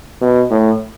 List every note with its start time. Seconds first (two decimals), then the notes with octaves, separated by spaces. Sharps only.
0.21 B2
0.51 A2